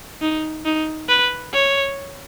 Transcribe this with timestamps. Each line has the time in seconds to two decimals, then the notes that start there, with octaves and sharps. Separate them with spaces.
0.22 D#4
0.65 D#4
1.09 B4
1.53 C#5